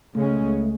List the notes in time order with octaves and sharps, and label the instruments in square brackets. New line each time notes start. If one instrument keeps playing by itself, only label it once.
[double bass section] C#2 C#3 G#3 C#4 [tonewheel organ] A3